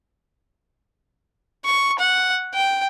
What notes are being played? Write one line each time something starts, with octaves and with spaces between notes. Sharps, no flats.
C#6
F#5
G5